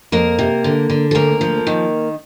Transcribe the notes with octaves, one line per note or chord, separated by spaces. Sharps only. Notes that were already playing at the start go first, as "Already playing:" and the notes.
F2 A#3 A#4
C3
D3
D3
A4
D2 A#3 A#4
F3
D#3